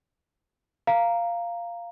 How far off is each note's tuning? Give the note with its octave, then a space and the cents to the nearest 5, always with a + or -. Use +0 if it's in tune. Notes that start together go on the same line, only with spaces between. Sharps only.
F5 -10 A#5 -5